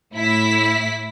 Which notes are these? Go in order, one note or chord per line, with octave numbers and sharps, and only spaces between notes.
A2 E4 B6